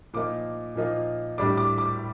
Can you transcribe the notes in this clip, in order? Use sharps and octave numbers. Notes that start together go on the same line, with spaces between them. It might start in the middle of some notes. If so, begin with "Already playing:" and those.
A#2 F3 A#3 D#4 D6
A#2 F3 A#3 D#4
A2 G3 D4 D6
D6
D6